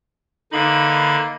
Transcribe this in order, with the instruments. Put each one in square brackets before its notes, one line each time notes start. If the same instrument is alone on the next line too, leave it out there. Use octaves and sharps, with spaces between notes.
[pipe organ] D3 B5 [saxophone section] E3 A#3 D#4